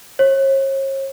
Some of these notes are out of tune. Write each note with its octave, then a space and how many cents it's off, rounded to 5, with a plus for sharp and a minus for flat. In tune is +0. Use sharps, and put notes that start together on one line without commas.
C#5 -40